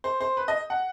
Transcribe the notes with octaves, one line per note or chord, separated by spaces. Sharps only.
C5
C5
B4
D#5
F#5